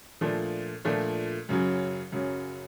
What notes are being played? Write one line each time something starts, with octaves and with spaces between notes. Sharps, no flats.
A#2 F3 A3 D4
A#2 F3 A3 D4
F#2 C#3 F#3
F#2 C#3 F#3